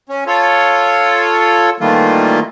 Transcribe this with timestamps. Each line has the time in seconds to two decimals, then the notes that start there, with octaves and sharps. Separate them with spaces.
0.09 C#4
0.27 F4 A4 C#5
1.80 D#3 E3 G3 A3 A#3 F4